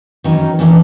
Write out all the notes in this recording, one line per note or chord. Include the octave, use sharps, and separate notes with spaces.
D#3 E3 F#3 C#4 D#4
A#2 E3 A#3 C#4 D4